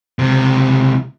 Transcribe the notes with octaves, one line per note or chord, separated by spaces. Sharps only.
C#2 C3